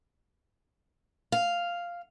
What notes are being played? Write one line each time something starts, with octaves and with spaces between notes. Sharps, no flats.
F5